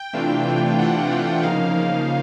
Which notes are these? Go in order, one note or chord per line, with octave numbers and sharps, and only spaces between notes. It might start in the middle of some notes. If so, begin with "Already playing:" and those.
Already playing: G5
C3 E3 A3 D4 F4
C3 E3 A3 D4 F4
C3 E3 A3 D4 F4 F#5
C3 E3 A3 D4 F4
C#3 F3 A#3 D#4 F5
C#3 F3 A#3 D#4